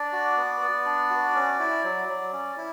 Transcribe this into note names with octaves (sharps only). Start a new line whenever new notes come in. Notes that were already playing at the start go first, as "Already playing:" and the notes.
Already playing: D4 D5
F#4
B3
B3
D4
F#4
C#4
E4
F#3
F#3
C#4
E4